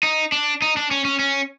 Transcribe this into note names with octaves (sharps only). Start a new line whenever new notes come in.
D#4
D4
D#4
D4
C#4
C#4
C#4